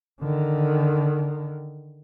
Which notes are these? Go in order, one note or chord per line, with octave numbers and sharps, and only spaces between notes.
D3 D#3